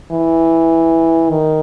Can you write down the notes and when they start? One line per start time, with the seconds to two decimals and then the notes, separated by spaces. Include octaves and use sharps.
0.11 E3
1.30 D#3